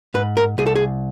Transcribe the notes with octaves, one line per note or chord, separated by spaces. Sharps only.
G#2 B4
A#4
C2 G#4
A4
G#4